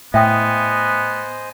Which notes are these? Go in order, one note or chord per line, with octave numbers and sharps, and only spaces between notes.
A2 B3 C5 D#5 E5 G5 G#5 D#6